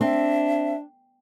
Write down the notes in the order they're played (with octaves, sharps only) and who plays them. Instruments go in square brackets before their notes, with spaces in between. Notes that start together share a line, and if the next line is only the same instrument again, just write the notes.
[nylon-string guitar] C4 [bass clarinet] D4 [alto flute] E5